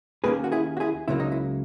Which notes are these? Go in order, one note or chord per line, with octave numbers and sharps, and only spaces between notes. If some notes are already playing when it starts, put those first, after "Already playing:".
D#2 D#3 A#3 C#4 G#4 B4
F#4
E4 G#4
F#4
E4 G#4
C#2 C#3 F#3 A#3 E4
D#4
E4